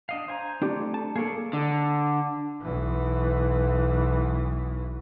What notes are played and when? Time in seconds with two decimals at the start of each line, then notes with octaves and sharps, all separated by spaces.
0.09 D4 D#5 F5
0.28 C5 G#5 A#5
0.62 A3 C4 D4 G4
0.94 A5
1.16 A#3 G#4 A4 C#5 D5
1.53 D3
2.61 B1 E3